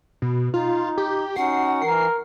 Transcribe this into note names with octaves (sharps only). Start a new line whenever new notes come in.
B2
D#4 F4
G4
C#4 D#4 F#4 F#5 C7
E3 A#4 C7